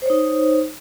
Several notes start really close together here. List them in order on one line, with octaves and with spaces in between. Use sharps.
C5 C#5 D#4